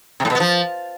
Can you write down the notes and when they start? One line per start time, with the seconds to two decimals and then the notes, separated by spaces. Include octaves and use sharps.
0.20 C3
0.25 A2
0.30 B2
0.35 B3
0.40 F3